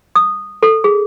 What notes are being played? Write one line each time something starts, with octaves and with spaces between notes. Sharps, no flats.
D#6
A4
G#4